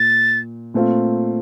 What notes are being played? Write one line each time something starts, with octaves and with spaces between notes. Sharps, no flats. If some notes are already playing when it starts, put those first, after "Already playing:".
Already playing: A#2 A6
A#2 A3 C4 F4